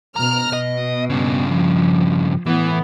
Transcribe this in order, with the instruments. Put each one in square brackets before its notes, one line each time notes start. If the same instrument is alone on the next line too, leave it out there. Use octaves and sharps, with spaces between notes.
[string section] B2 F6 [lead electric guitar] A#5
[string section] B2 [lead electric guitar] D#5
[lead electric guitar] G2 C#3
[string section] F3
[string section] A2 B3 [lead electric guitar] E3